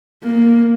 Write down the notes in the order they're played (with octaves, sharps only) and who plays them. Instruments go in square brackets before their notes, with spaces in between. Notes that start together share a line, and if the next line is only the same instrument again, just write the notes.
[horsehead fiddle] A#3